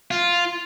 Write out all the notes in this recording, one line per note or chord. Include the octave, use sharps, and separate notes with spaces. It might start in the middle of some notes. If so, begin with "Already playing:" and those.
F4